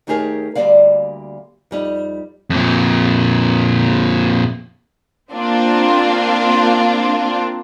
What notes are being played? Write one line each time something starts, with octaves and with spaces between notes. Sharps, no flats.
D#2 A3 D#4 G4 G#4 A#4
D2 F3 G3 A#3 D5 F5
F2 G3 D#4
F2 A#2
A#3 C4 D4 F4